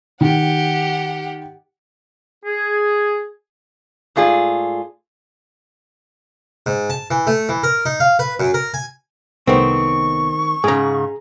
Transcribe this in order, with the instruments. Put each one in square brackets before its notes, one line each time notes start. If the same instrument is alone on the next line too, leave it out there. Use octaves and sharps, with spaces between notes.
[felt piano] D#3 [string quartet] G4 F#5
[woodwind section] G#4
[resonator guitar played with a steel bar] G#2 A3 F4 G#4 D5
[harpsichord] G#2
A5
E3
A3
E3
A#4
D#4
F5
B4
F#2
A#4
G#5
[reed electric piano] C2 B3 [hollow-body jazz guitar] D#3 A3 C4 [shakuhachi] C#6
[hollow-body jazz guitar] G#2 C#3 [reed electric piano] G#4 A#5